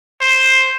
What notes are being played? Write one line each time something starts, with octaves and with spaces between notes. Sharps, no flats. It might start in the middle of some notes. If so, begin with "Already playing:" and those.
C5